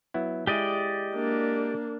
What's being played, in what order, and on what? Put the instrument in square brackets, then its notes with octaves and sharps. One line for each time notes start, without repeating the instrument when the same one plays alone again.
[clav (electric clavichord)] F#3 B3 E4
[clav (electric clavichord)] G#3 E4 G#4 [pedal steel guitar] G4 D5 D#5
[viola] A#3 D4